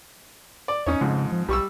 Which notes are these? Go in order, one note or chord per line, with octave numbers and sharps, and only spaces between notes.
D5
E2 C#4 D#4 C#5
F2 G#2 C#3
F3
B1 G3 C#6 E6